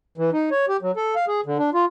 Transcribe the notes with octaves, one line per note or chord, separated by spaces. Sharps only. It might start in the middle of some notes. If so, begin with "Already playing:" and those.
E3
D#4
C#5
G4
F#3
A4
F5
G#4
D3
D4
F4